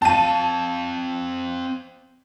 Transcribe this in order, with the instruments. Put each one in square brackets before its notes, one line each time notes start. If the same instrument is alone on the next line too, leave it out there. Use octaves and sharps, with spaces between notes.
[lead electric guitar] C4 F5 [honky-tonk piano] A5 D#7